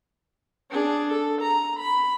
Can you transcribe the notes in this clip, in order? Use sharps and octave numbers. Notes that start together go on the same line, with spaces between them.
D4 G#4
A4
A#5
B5